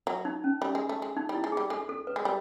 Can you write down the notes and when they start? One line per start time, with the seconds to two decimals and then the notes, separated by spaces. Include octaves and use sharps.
0.07 F#3
0.25 D#4
0.44 C#4
0.62 G3
0.75 G#3
0.89 A3
1.02 G#3
1.17 D#4
1.29 G3
1.34 E4
1.44 G#3
1.52 G3 G#4
1.70 G#3 A4
1.89 A4
2.07 B4
2.16 G#3
2.25 G3